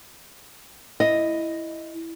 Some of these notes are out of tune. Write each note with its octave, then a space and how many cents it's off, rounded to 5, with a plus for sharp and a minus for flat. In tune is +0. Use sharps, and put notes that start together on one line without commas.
E4 +0 D#5 +0